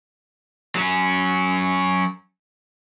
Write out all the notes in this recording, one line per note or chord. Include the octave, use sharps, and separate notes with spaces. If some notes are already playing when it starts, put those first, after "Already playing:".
F#3 C#4